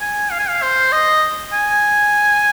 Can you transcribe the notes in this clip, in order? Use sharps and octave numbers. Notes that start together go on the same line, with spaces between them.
G#5
F5
G#5
F5
C5
D#5
G#5